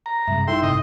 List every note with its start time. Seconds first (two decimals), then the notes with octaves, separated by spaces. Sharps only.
0.06 A#5
0.28 G2 C3 G#3 E5
0.48 G2 D#4 E4 A4 E5 G5 C6
0.62 G1 G#2 C3 D#5